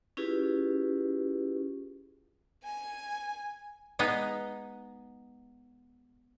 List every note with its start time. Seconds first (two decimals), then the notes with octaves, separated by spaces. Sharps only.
0.17 C#4 E4 F4 G4 G#4 B4
2.64 G#5
3.99 G#3 B3 D#4